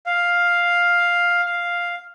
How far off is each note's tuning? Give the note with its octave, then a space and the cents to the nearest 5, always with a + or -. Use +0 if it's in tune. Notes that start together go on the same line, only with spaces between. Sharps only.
F5 +5
F5 +0